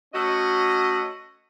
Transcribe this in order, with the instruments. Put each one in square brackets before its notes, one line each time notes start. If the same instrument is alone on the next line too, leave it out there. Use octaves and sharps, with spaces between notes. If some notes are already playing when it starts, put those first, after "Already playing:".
[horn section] A3 C#4 F#4 D#5